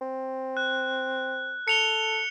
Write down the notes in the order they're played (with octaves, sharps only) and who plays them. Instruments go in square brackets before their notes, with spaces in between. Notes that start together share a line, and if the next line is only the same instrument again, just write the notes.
[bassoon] C4
[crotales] F#6
[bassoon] A4 [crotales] C#7 F7 G7